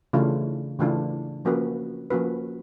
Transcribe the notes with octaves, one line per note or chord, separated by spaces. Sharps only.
C#3 E3 A3 D4 F4
C#3 E3 A3 D4 F4
F3 A#3 C#4 F#4 B4
F3 A#3 C#4 F#4 B4